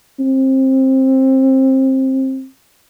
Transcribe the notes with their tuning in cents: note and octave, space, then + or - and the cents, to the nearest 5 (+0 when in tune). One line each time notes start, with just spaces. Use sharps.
C4 +20